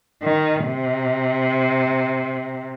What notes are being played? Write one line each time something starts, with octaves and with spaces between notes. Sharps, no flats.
D#3
C3